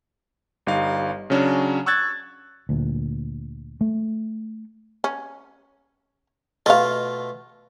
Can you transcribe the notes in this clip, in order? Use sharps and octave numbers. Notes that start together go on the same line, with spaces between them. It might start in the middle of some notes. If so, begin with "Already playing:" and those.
G1 G3 D#4 F5
C#3 F#3 C#4 D4
C#6 E6 F#6 G#6 A6
D2 A#2
A3
C#4
B2 A3 F4 D#5 F5